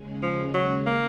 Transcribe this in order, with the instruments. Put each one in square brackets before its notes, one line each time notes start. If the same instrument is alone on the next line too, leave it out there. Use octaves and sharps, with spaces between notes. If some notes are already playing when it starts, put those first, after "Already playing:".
Already playing: [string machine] D#2 C#3 G#3 C#4 G#4
[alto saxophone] F3
F#3
A#3